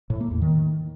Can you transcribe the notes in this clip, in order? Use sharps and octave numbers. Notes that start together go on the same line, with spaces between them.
A2
A#3
E2
D#3